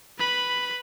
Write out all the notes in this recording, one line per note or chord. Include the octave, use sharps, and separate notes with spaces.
B4 B5